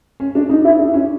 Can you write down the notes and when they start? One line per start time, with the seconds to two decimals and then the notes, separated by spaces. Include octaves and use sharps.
0.20 C#4
0.35 D4
0.49 D#4
0.64 E4
0.79 D4
0.94 C#4